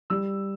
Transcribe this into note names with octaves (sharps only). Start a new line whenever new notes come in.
G3 E6